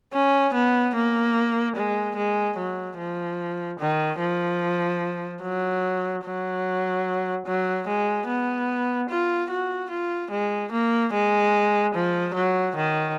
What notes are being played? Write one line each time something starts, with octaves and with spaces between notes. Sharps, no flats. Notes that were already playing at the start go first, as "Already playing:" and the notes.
C#4
B3
A#3
G#3
G#3
F#3
F3
D#3
F3
F#3
F#3
F#3
G#3
B3
F4
F#4
F4
G#3
A#3
G#3
F3
F#3
D#3